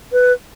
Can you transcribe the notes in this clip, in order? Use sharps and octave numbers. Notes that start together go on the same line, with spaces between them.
B4